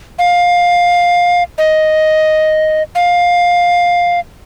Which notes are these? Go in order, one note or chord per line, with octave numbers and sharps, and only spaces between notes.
F5
D#5
F5